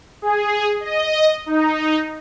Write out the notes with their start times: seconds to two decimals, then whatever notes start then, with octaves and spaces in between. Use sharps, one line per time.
0.22 G#4
0.80 D#5
1.46 D#4